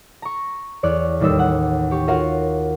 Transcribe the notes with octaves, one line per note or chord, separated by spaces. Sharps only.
A#5 C#6
E2 C#5 D5 F6 F#6
A1 D#2 G3 D#4 E6
F#5
G4 C#6
F4 F#4 A#4 C#5 F5 F#5